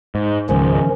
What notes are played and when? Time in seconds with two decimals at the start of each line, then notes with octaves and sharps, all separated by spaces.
0.15 G#2
0.49 C#2 G#2 D#3 F3 C#4